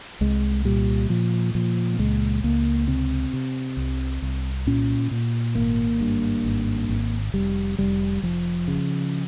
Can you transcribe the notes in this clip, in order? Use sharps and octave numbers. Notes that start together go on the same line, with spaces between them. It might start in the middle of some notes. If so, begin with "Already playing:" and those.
C2 G#3
A#2 G3
A#2 F3
A#2 F3
A#3
C#2 G#3
C#2 A#3
C3 C4
C3
C2
C2
A#2 C#4
A#2
G#1 A#3
G2
G#1
G#1
F1 G3
F1 G3
F1 F3
C#3